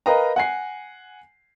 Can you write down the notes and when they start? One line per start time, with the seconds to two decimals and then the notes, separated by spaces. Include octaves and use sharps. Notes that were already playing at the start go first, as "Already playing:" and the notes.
0.06 A#4 B4 D#5 F5 G5 A#5
0.36 F#5 G#5 C7